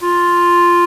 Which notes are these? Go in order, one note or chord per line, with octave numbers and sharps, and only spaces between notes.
F4